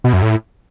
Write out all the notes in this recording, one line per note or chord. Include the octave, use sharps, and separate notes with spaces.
B2
F#2
A2